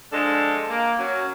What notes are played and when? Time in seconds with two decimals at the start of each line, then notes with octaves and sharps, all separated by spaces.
0.12 F3 G#3 D4 A4
0.69 A#3
0.98 F#3 C#4